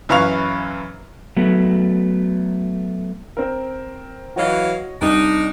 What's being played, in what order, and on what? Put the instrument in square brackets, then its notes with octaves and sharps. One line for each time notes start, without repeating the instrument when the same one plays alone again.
[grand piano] F#2 E3 B4 F5 C#6 F7
[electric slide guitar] F#3 A3 B3
[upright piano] C4 A#4
[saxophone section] E3 F#3 F5 [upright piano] F#4 C#5 D#5
[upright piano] C2 [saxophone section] D4 D#4